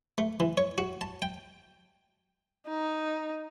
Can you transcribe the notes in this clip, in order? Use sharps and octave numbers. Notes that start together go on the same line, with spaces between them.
A3
E3
C#5
F#4
A5
G5
D#4